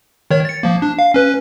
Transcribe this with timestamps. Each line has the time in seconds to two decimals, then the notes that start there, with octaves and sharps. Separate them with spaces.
0.31 D#3 C#5
0.45 A6 C#7
0.63 F3 A#3
0.82 D4
0.99 F5
1.14 C#4 B4